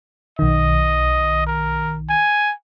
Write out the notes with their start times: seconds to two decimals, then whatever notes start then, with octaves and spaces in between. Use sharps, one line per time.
0.39 B1 D#3 D#5
1.47 A#4
2.09 G#5